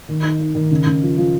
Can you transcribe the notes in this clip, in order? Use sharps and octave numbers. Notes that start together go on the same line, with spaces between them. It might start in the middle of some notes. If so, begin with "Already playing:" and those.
D#3
D#4
D#4
D#3
C#3
C#3
F3
F3